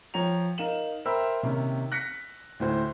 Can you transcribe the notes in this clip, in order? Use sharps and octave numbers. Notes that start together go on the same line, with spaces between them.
F3 C#5 G5 A#5 F7
D#4 A#4 F5 E7 F#7
A#4 C5 E5 G5 B5 E6
C3 D#3 A#3 C#4
F#6 A#6 B6 C#7
D2 A2 C5